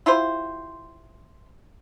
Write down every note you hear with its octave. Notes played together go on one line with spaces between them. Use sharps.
E4 F4 G4 C5